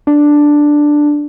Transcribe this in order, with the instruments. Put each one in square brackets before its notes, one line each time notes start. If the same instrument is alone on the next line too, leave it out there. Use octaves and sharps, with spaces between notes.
[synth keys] D4